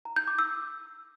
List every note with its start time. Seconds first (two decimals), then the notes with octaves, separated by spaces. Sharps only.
0.05 A#5
0.16 G6
0.27 D6
0.39 E6